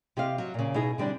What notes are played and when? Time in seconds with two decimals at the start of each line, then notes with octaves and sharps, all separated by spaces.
0.17 C3 G4 C5 D#5 F5
0.38 F#3
0.54 A#2 C#3
0.74 B2 D#4 E4 G#4
0.98 D3 G3 C4 D4